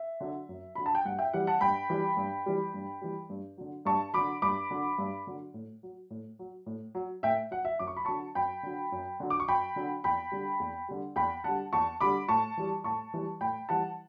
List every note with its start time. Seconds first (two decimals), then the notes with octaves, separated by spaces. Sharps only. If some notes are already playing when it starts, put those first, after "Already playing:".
Already playing: E5
0.21 D3 F#3
0.49 F#2
0.75 D3 F#3 B5
0.86 A5
0.95 G5
1.05 G2 F#5
1.19 E5 G5
1.33 E3 G3 F#5
1.47 F#5 A5
1.61 G2 G5 B5
1.90 E3 G3
2.17 G2
2.46 E3 G3
2.74 G2
3.02 E3 G3
3.30 G2
3.58 D3 F#3
3.85 G2 A5 C#6
4.14 D3 F#3 B5 D6
4.42 G2 B5 D6
4.70 D3 F#3
4.98 G2
5.27 D3 F#3
5.54 A2
5.83 F#3
6.10 A2
6.39 F#3
6.66 A2
6.95 F#3
7.23 A2 E5 G5
7.51 F#3 F#5
7.65 E5
7.79 F#2 D6
7.87 C#6
7.97 B5
8.05 D3 F#3 A5 C#6
8.35 F#2 G5 B5
8.63 D3 F#3
8.92 F#2
9.20 D3 F#3
9.30 D6
9.40 C#6
9.48 F#2 G5 B5
9.76 D3 F#3
10.04 E2 G5 B5
10.32 D3 G3
10.60 E2
10.88 D3 G3
11.16 E2 G5 B5
11.44 D3 G3 F#5 A5
11.73 E2 A5 C#6
12.01 D3 G3 B5 D6
12.28 A2 A5 C#6
12.57 E3 G3
12.84 A2 A5 C#6
13.14 E3 G3
13.41 A2 G5 B5
13.69 E3 G3 F#5 A5